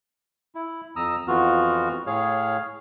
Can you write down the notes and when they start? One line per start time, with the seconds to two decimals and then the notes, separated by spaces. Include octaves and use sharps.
0.55 E4
0.96 F2 A#5 D#6 E6
1.28 F2 E3 B3 F4 F#4 F6
2.07 A2 G#4 C#5 F5 F6